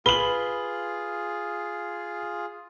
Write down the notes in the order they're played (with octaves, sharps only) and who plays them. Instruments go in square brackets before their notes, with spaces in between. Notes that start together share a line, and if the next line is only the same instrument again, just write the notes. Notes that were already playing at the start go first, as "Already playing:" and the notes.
[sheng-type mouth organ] F4 G#4 [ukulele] B4 [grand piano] F#7 G7